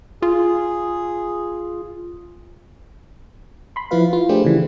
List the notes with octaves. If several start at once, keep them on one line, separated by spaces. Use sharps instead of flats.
F4 G#4
B5 C6
F3 E4 F4 B4 F5
F4
A3 D4 G4 G#4 C5
C#3 E3